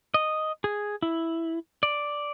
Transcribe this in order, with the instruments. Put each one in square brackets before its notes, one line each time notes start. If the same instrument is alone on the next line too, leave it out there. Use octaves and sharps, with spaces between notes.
[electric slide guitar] D#5
G#4
E4
D5